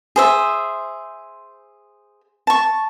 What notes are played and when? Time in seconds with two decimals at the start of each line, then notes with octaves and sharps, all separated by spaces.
0.16 G#4 C5 E5
2.47 A5 C#6